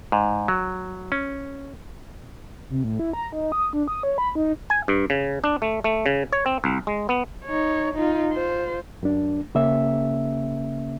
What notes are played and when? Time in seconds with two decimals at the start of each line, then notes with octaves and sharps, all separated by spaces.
0.12 G#2
0.48 F#3
1.12 C#4
2.70 C3
2.84 A2
2.99 E4
3.13 A#5
3.32 D#4
3.52 D#6
3.73 D4
3.88 D#6
4.03 C#5
4.18 B5
4.35 D#4
4.70 G#5
4.88 G2
5.10 C#3
5.44 D4
5.62 A3
5.84 A3
6.06 C#3
6.33 C#5
6.46 C4
6.64 C2
6.87 G#3
7.09 B3
7.45 D#4 C#5
7.94 D#4 F4
8.33 F4 C5
9.03 F#2 D4
9.55 C#3 A#3 C#4 E5